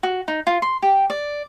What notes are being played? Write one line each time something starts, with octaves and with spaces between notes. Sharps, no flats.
F#4
D#4
F4
C6
G4
D5